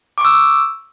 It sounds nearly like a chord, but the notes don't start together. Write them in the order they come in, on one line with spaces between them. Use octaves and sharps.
D6 C#6 E6